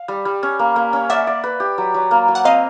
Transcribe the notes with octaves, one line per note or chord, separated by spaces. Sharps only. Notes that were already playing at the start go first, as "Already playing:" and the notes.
Already playing: F5
G3
G3
C#4
A#3
A#3
C#4
D5 E5 F#5
D5
B4
G4
F#3
F#3
A#3
F#3
F#5
C4 D#5 F5